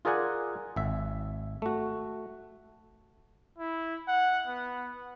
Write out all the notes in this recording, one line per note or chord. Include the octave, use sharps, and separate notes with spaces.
F4 G#4 A#4 D5 F#5 G#5
G#1 E5
A3 F#4
E4
F#5
B3